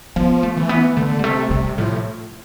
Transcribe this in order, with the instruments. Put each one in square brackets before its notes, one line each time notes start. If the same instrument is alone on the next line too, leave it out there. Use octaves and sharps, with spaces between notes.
[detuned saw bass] F3 [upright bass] B3
[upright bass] A3
[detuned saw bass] E3
[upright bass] B3
[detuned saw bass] D3 [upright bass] A3
[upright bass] G3
[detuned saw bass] C3 [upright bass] A3
[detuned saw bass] C3 [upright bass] G3
[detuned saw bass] A2 [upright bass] F3